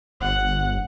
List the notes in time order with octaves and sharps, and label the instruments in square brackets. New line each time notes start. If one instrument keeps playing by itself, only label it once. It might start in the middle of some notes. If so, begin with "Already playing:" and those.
[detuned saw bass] G1 [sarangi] F#5